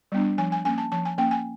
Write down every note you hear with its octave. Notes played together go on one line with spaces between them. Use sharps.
G3 B3 D4
F3 G#5
G#5
A#3 C#4 G#5
A5
F3 A5
G#5
A#3 C#4 G5
G#5